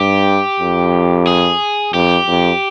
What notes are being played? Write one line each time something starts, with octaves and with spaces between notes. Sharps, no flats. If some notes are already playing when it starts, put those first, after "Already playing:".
Already playing: G2 G4
F2
G#4
F2 G4
F2